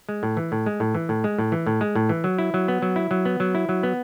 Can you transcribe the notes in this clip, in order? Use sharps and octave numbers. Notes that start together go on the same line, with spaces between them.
G#3
A2
E3
A2
G#3
A2
E3
A2
G#3
A2
E3
A2
G#3
A2
E3
F#3
E4
F#3
B3
F#3
E4
F#3
B3
F#3
E4
F#3
B3